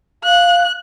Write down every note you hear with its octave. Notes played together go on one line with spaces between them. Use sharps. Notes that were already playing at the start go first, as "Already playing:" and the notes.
F5 F#6